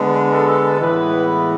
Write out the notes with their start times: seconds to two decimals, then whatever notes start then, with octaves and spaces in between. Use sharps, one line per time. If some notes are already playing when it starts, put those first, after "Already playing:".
Already playing: D3 G#3 B3
0.30 A4
0.80 A2 E3 G#3 B3 B4